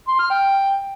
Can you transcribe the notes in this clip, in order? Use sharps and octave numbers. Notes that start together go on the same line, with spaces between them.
C6
F6
G5